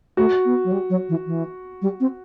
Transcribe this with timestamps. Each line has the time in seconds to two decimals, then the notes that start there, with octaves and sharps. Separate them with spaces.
0.17 A3 F#4
0.45 B3
0.65 F#3
0.72 G3
0.90 F#3
1.09 E3
1.26 E3
1.82 G3
2.00 C4